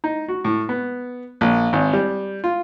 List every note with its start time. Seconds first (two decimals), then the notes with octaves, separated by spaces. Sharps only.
0.04 D#4
0.28 F#4
0.45 A2
0.69 B3
1.41 A#1
1.73 G#1
1.93 G3
2.44 F4